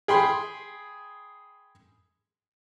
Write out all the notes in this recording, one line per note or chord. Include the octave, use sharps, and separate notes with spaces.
G#4 G5 B5 C6